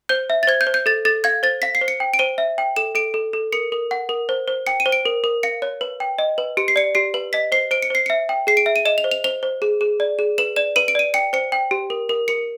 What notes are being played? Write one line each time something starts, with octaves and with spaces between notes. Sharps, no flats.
C5 G6
E5
A6
C5 G#6
G6
C5
G6
A4 A6
A4 A6
F5 G#6
C5 A6
F5 B6
C7
C5
C#7
G5
D7
C5 D#7
E5
G5
A4 E7
A4 D7
A4
A4
A#4 C#7
A#4
F#5
A#4
C5
C5
G5 C#7
D#7
C5
D7
A#4
A#4
F5 C#7
C#5
B4
G5
D#5
B4
G4 C#7
C7
D5 C#7
G4 C7
B4
D#5 B6
C5 C7
C5 D7
C#7
C5 C7
E5 C#7
G5
G#4 C7
D7
E5
D#7
D#5 E7
F7
C5
F7
C5 F7
C5
G#4
G#4
D5
G#4
B4 E7
D5 E7
B4 D#7
D7
D5 D#7
G5 C#7
C5 C#7
G5
G4
A#4
A#4
A#4 C#7